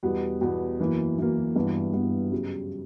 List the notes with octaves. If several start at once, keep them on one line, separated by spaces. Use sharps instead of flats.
E2 B2 G3 B3
E2 B2 G3 B3
F#2 E3 A#3
F#2 E3 A#3
G2 E3 B3
G2 E3 B3
F#2 C#3 G3